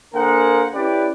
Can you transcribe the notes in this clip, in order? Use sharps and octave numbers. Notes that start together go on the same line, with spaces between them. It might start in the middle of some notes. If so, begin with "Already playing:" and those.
D3 A#3 G#4 A#4 C5 F#5
C#4 E4 G4 B4 D5